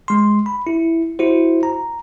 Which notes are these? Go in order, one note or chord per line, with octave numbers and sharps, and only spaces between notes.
G#3 C6
B5
E4
E4 F#4 C5
A#5